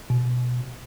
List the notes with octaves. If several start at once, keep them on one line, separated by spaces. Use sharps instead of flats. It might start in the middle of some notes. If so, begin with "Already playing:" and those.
B2